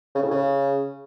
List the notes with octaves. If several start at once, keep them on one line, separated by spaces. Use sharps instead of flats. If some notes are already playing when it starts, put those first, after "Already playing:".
C#3
A2
C#3